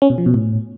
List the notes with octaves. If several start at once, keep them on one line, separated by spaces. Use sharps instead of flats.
C#4
B2
F3
B2
A2